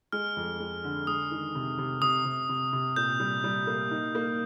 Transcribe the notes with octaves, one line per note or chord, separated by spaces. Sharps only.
G#3 F6
F2
G#3
D3
G#3 D#6
D#3
C3
C3
C3 D#6
C3
C3
C3
A#2 G6
G3
G3
A#3
D#4
A#3